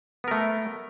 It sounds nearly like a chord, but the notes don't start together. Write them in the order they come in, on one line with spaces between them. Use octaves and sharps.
B3 A#4 A3